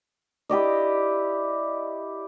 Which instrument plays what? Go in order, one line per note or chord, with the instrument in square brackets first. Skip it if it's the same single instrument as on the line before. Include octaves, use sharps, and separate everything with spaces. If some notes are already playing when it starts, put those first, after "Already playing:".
[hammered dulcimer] E4 G4 D5 D#5